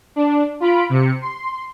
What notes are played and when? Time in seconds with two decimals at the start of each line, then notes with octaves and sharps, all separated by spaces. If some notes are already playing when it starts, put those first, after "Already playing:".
0.16 D4
0.60 F4 B5 D7
0.90 C3 C#7
1.21 C6